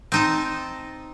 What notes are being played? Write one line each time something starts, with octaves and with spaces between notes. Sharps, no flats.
C4 D#4 A5